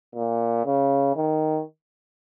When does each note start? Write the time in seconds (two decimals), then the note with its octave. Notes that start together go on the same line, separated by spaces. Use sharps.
0.15 A#2
0.65 C#3
1.16 D#3